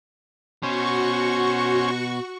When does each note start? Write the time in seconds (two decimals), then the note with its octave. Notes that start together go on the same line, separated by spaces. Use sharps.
0.63 B2 C#4 F#4 C5 C#6